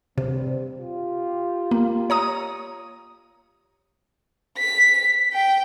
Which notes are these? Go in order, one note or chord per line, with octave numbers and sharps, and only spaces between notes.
G2 C3 G3 C4
F4 G4
A#3
C#5 A#5 D#6
B6
G5